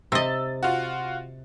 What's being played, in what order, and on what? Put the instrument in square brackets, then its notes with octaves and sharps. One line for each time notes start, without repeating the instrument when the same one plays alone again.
[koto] C3 D#5 [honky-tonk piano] E6 A6
[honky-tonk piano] F4 F#4